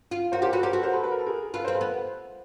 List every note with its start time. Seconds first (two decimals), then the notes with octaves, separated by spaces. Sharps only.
0.11 F4
0.32 F#4 A#4 C5
0.42 G4 A#4 C5
0.53 F#4 A4 B4
0.63 G4 A#4 C5
0.73 F#4 A4 B4
0.83 A#4 C5
0.93 A4 B4
1.03 B4
1.11 A#4
1.19 A4
1.26 G#4 A#4
1.54 F4 A4 B4
1.64 A#4 C5
1.68 C4
1.74 A4 B4
1.81 B3